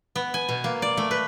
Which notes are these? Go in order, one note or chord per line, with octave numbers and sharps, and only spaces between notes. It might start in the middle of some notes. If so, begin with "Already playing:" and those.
B3
G#5
B2
A#3
D5
A3
B4